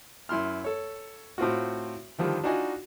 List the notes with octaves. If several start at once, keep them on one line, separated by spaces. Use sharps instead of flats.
F#2 E4 C6 F6
A4 C#5
A2 C4 F4 F#4
D3 D#3 F3 G3
D4 D#4 F4 F#4 D#5 G#5